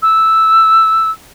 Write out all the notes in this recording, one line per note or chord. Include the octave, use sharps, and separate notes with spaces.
E6